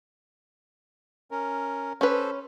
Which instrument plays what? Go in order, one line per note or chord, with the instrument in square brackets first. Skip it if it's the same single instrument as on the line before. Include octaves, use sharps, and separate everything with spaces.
[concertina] C#4 A#4
[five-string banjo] C#4 B4 [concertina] A4 C5